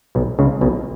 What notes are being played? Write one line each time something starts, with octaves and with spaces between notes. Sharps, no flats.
B1 B2
C#2 C#3
B1 B2